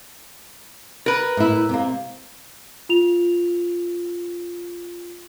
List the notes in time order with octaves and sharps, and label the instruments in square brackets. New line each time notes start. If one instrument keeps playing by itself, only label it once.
[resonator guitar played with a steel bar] A#4 B4
[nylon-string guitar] A2 E4
C3 A#3
[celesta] F4 F7